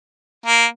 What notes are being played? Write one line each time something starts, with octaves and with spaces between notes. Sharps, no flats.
A#3